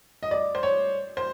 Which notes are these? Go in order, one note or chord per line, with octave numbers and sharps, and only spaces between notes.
D#5
D5
C5
C#5
C5